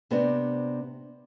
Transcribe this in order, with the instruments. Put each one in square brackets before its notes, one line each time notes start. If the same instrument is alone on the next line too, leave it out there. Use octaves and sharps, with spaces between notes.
[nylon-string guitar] C3 B3 C4 D4